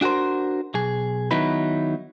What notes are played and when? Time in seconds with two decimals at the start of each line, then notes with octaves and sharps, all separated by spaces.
0.01 D4 F#4 G4 A#4 C5
0.74 B1 G#4
1.31 D#3 F#3 B3 D#4 E4 B4